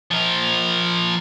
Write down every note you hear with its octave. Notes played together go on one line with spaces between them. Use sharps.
F3 A#4